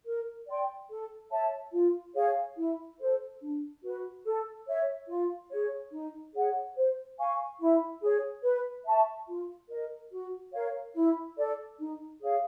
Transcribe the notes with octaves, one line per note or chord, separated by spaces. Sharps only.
A#4
D5 G5 C6
A4
C#5 E5 A5
F4
G#4 C#5 F5
E4
A4 C5
D4
F#4 B4
A4
C#5 E5
F4
G#4 C#5
D#4
G#4 C#5 F#5
C5
F5 G#5 C#6
E4
G#4 C#5
B4
E5 A5 C#6
F4
A#4 D#5
F#4
A#4 C#5 F5
E4
A4 D5
D#4
G#4 C#5 F5